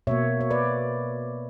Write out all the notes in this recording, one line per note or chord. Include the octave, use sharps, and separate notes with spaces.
B2 A#3 C#5 E5
C#5
B4 D5